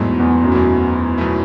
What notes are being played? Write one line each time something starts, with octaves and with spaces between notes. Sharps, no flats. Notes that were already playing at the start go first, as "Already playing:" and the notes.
Already playing: E2 G#2 B2 F#3 A3 E4
E2
F#2
E2 B2 F#3 A3 E4
B2 F#3 A3 E4